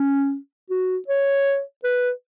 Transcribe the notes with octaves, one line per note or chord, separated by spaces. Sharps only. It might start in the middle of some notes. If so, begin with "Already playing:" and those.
Already playing: C#4
F#4
C#5
B4